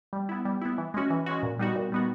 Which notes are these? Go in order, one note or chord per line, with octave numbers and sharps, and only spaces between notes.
G3
B3 E4
G3
B3 E4
E3
G#3 C#4 F#4
E3
G#3 C#4 F#4
A#2
G3 B3 D#4 F#4
A#2
G3 B3 D#4 F#4